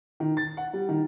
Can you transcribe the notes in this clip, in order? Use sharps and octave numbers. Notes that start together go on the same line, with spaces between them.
D#3
A6
F#5
G3
D#3